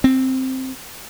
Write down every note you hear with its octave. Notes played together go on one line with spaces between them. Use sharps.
C4